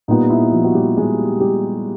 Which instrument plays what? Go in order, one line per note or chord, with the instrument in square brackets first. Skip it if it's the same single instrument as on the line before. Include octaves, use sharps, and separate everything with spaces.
[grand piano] A#2 G3 B3 D#4
E4
F3 F4
F#4
G3 G4
G#3 G#4
G3 G4